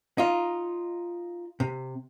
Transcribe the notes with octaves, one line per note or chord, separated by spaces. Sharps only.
D#4 F4
C3